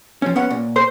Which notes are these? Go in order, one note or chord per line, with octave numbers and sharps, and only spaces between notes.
F3 C#4
B3 C#4 F#5
A#2
C5